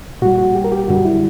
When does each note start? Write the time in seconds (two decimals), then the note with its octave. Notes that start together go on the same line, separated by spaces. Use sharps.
0.22 A#2 G3 F#4
0.38 F#4
0.55 G4
0.64 A#4
0.72 G4
0.84 G4
0.88 F#2 D3 G3 F#4
1.05 E4